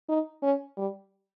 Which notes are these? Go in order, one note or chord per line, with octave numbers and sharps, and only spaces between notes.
D#4
C#4
G3